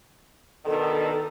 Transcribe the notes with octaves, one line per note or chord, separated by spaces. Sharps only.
B2 D3 D#3 A4